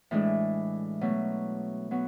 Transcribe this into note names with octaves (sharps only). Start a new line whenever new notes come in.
A2 E3 G#3 D4
B2 F#3 A3
F#3 B3 F#4